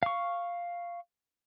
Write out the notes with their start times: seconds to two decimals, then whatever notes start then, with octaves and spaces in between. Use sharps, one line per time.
0.03 F5 C#6